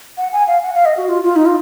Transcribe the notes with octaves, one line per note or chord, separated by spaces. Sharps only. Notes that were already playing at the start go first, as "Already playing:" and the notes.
F#5
G#5
F5
F#5
F5
D#5
F#4
F4
F4
D#4
F4